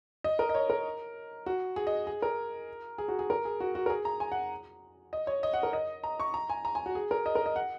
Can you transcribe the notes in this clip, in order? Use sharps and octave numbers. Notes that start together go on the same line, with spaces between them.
D#5
A#4
D#5
C#5
A#4
F#4
G#4
D#5
G#4
A#4
G#4
F#4
G#4
A#4
G#4
F#4
F#4
A#4
G#4
A#5
G#5
F#5
D#5
C#5
D#5
F#5
A#4
D#5
A#5
C#6
A#5
G#5
A#5
G#5
F#4
G#4
A#4
D#5
A#4
D#5
F#5